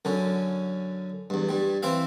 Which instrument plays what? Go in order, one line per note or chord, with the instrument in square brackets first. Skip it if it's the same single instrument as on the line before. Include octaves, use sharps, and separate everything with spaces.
[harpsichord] F#2 D3 C#4
E2 G2
G2 G3
E3 C4 E4 E5 F5